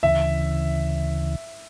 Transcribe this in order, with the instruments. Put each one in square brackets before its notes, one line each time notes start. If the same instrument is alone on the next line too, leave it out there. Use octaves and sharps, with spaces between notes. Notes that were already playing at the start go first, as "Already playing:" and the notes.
[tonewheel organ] D2 C#3 E3 [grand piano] E5